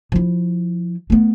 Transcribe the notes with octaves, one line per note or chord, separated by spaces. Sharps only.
F3 E4
A3 B3